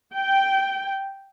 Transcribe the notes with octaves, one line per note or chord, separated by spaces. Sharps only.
G5